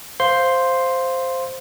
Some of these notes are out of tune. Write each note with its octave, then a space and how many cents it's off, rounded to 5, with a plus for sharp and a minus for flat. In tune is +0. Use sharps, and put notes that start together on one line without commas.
C5 +0 F5 +0 C6 +0